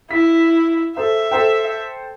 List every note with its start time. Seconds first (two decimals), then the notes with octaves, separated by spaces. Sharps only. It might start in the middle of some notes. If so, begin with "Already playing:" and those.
0.11 E4 B6
0.97 A4 C5 E5
1.31 A4 C5 G5